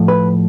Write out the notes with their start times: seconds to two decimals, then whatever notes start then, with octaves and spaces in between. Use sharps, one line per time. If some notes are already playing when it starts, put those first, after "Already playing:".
Already playing: A2 F3 A3
0.08 B4